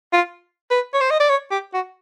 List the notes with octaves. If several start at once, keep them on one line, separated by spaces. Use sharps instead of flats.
F4
B4
C#5
C5
D#5
D5
C#5
G4
F#4